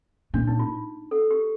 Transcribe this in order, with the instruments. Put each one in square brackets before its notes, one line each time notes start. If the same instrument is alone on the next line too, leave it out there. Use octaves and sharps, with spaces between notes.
[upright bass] A#2 [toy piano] D4
[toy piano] D#4
F4
A4
G4